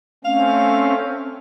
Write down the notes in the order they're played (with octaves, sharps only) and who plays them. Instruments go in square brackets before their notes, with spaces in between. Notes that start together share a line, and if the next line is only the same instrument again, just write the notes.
[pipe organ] A3 C4 C#4 [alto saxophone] F5